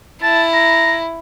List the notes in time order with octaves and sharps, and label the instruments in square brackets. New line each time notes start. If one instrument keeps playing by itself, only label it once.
[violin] E4 [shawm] A5
[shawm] A#5